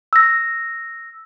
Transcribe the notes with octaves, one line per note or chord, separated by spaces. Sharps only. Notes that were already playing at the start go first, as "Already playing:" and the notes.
E6 A#6